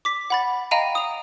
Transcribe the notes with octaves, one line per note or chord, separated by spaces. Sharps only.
D6 B6
F#5 B5 A6
D#5 F5 G5 A#5 B5 D#7
D#6 F7